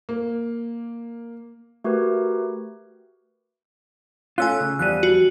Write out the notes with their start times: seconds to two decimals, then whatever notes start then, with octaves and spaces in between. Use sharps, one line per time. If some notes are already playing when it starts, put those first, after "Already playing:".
0.09 A#3
1.84 A3 F#4 G4 A#4 B4
4.38 A3 C#4 F4 G#5 E6 F#6
4.60 C#3
4.79 E2 F3 G3 F#6 D#7
5.03 F#4